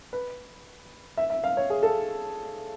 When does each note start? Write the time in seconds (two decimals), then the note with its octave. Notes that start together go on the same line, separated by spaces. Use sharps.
0.13 B4
1.17 E5
1.30 E5
1.44 F5
1.57 C#5
1.70 G#4
1.83 A4